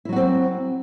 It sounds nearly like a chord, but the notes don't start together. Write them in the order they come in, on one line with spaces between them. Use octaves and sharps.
E4 F#3 F#4 C4